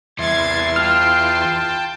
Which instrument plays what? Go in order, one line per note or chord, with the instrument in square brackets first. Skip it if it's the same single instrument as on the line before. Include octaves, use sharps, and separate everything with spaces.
[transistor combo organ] E2 C6 [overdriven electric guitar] G3 E4 [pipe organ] G#6 A6
[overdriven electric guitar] F4 [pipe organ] G5 A5 [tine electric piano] F6